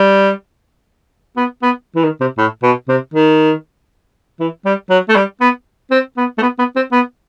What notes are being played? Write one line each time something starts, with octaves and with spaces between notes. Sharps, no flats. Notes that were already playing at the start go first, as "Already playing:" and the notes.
Already playing: G3
B3
B3
E3
D#3
C3
A2
B2
C3
D#3
E3
G3
F#3
A3
G3
B3
C4
B3
A3
B3
B3
C4
B3